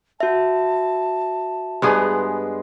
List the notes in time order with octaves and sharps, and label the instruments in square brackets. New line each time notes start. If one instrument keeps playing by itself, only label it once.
[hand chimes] F#4 E5 [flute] A5
[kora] G2 B3 G#4 [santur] G#3 D4 B4